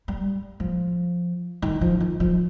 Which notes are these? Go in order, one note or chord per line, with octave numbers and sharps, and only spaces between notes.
G3
F3
D#3
F3
D#3
F3